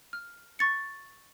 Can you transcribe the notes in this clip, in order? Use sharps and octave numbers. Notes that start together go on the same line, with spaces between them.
F6
C#6 A6 C#7